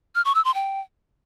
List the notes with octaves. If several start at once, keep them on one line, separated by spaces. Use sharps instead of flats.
F6
C#6
E6
C6
G5